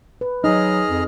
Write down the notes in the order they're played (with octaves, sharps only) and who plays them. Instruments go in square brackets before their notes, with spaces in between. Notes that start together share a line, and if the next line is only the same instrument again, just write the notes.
[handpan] B4
[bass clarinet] F#3 [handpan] D#4 [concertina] G#4 D#5 F6
[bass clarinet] F2